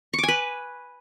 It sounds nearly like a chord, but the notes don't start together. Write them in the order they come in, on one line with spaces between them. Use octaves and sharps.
C#6 D6 G#5 B4